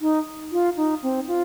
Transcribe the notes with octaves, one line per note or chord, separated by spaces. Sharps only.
D#4
F4
D#4
C4
F4